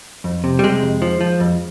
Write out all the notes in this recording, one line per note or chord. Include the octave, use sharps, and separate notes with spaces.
F2
C3
G3
C3 G#3
F2
F3
F3
F2